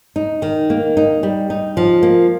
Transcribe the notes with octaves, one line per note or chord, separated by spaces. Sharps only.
D#4
D#3
A#3
D#4
G3
D#4
F3
A#3